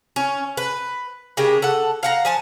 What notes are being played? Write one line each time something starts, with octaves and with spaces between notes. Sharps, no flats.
C#4
B4
C#3 G#3 G4 A#4
A4 F#5
F5 F#5 A#5
F3 G#5 A5